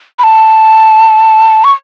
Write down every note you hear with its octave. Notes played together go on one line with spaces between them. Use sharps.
B5
A5
C#6